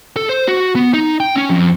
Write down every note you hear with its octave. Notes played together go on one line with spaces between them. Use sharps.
A4
C5
F#4
B3
D#4
G5
C#4
F2